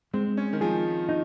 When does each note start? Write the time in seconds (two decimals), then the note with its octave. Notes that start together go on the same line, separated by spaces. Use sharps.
0.13 G#3 C4
0.37 C#4
0.53 D#3
0.61 F3 G#4
1.09 D#4